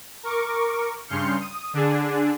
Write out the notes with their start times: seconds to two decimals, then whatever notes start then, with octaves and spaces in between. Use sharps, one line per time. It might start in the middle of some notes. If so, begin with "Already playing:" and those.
0.23 A#4 C#6 D6
1.07 G2 C#3 C6 F6 G6 C#7
1.40 D#6
1.73 D3 D4 G#4